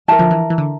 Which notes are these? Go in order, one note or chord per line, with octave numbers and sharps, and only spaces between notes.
E3 A#4 E5 A5
D3 F3
E3
E3
D3